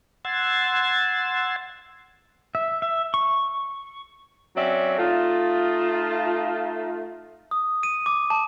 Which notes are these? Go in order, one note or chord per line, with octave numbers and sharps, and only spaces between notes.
F#5 C6 E6 G#6 A6
E5
E5
C#6
F#3 C4 C#4 D5 E5
A3 D#4 F4
D#6
D#7
D6
A5